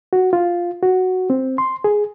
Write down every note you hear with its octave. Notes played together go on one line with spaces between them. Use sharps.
F#4
F4
F#4
C4
C6
G#4